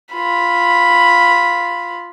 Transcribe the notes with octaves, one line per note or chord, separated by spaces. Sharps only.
F4 B5